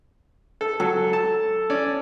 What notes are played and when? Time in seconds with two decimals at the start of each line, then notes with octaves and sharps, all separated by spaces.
0.61 A4
0.80 F#3 A4
1.13 A5
1.70 C#4 D5